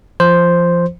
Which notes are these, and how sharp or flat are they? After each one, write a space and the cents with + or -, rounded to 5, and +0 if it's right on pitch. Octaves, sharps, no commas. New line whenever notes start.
F3 -20 C5 +0